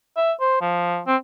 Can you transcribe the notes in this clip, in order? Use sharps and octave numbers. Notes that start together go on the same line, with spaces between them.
E5
C5
F3
C4